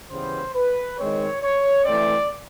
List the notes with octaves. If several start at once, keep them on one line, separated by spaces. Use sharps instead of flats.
C#3 E3 G3 B3 C5
B4
D#3 G#3 C4 C#5
C#5
E3 A3 C4 D5